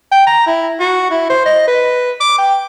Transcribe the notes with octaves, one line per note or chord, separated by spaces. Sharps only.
G5
A#5
E4
F#4
E4
C5
D#5
B4
D6
G5